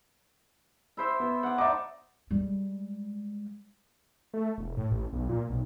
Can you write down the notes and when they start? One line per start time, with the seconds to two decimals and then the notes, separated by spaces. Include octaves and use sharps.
0.97 E4 C5 E5
1.20 B3
1.43 F#5 D6
1.58 D4 D#4 E5 D6
2.31 G3 G#3
4.34 A3
4.58 E1
4.77 A2
4.91 A1
5.13 B1
5.29 A#2
5.49 B1